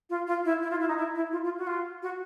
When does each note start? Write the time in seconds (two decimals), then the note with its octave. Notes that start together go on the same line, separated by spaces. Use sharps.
0.10 F4
0.27 F4
0.45 E4
0.62 E4
0.71 F4
0.80 E4
0.89 D#4
0.97 E4
1.15 E4
1.32 F4
1.44 F4
1.58 F#4
1.67 F4
2.02 F#4